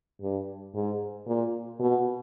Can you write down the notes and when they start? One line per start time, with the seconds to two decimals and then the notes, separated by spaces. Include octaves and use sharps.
0.21 G2
0.74 G#2
1.26 A#2
1.80 B2